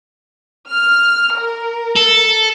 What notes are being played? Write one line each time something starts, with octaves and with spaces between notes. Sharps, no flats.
F6
A#4
A4